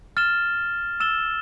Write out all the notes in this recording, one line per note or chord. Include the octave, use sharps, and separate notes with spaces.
F6 A6 E7 G7
E6 A6 E7 G7